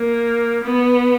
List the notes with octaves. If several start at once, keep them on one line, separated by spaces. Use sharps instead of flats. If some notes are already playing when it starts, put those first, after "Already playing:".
Already playing: A#3
B3